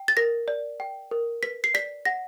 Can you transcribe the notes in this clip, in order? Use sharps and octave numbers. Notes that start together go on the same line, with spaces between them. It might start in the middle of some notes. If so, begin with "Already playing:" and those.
Already playing: G5
A6
A#4 A#6
D5
G5
A#4
B4 B6
C7
D5 B6
F#5 A#6